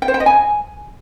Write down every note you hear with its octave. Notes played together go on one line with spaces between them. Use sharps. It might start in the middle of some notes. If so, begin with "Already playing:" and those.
G5
C5
G5
D#5
G#5